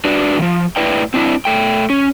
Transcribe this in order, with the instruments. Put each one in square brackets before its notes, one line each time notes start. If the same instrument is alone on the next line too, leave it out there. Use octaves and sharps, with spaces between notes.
[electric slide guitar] D4 F#4 B4 D5
D#3 F3
A2 E4 B4 D5 G5
C4 D4 E4
A3 G5
C#4